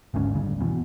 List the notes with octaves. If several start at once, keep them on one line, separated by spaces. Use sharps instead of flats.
G#1 D2 G#2 C#4
G#1 D2 G2 C#3
E2 B2